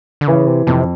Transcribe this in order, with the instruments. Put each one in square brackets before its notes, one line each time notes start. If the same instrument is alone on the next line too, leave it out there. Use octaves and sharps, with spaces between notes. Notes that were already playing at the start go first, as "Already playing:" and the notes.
[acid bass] D3
[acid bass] C#3 [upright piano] E3
[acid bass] C3
[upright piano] F2 [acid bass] C3